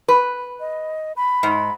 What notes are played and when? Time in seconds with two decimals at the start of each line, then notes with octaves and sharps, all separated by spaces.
0.08 B4
0.60 D#5
1.16 B5
1.43 G#2